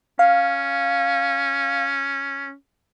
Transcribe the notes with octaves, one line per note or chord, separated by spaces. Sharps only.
C#4 F5